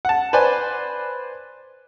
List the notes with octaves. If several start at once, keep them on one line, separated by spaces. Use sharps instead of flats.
F#5 A5
B4 C5 D5 G#5